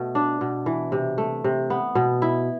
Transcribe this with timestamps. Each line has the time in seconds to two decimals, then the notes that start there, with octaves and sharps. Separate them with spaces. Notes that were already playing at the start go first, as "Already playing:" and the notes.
Already playing: B2 A3
0.15 D4
0.41 B2
0.66 E3
0.92 C3
1.18 A3
1.44 C3
1.70 B3
1.95 B2
2.22 E4